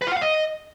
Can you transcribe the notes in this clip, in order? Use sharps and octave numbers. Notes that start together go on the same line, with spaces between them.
B4
F4
F#5
F5
D#5